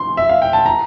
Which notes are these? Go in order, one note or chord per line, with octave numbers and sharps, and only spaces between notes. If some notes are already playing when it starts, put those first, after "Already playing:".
Already playing: C6
E5
F5
G5
A5
A#5